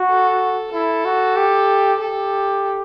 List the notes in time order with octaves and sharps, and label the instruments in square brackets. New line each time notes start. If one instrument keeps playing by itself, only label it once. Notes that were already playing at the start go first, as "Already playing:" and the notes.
Already playing: [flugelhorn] F#4
[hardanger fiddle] A4
[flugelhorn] E4 [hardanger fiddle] A4
[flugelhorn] F#4
G4
[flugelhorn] G4 [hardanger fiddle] A4